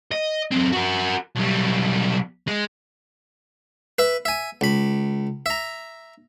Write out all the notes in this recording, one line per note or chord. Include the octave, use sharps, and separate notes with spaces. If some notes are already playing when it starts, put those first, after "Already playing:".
D#5
F#2 C4
F#4 A#4
B1 G3
G#3
B4 E5
E5 G#5
C#2 B5
E5 A#5